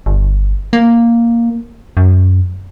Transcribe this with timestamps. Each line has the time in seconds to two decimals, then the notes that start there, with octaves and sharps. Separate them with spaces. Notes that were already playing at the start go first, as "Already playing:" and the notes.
0.06 G1
0.73 A#3
1.97 F#2